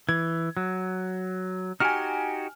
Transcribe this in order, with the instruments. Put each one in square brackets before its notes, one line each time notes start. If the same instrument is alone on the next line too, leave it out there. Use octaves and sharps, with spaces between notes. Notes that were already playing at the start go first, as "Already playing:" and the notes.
[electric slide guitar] E3 [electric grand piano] G#6
[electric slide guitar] F#3
[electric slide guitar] D#4 F#4 G4 [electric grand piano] G#5 F6